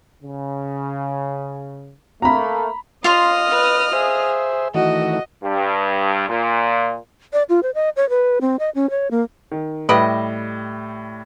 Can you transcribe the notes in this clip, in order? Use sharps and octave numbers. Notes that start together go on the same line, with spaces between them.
C#3
A3 A#3 A#5 B5
F4 D#5 F5 C6 D#6 F6
B4
G#4 C5 E5
D#3 E3 A3 F#4 D#5
G2
A#2
D5
F4
C5
D#5
C#5
B4
C4
D#5
C#4
C#5
A#3
D#3
A2 G3 G4 B4 D#5 E5